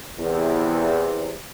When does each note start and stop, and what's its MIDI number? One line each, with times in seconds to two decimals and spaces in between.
0.19 1.35 40
0.19 1.35 48